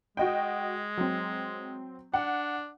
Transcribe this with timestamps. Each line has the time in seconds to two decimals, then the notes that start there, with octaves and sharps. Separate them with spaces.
0.17 G#3 F#4 D#5 G5
0.98 F#3 C4
2.14 D4 F#5